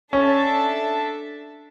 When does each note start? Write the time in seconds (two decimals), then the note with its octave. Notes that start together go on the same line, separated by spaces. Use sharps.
0.13 C#4 D4 A4 E5 A5